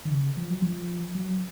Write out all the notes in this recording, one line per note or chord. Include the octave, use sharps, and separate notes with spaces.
D#3
C#3
F3
F#3
F3
F#3